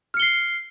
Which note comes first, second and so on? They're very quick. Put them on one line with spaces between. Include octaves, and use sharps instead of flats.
F6 C#7 G7 C7